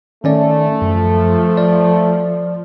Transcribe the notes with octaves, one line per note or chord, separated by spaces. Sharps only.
D#3 A3 C#4 D5
F#2 F3
D5